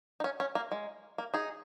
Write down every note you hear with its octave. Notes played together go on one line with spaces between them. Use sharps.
D#4
C#4
C#4
A#3
G#3
A#3
D#4 G#4